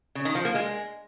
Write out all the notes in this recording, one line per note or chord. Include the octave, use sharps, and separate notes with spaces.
C#3
D#3
F3
A#3
G#3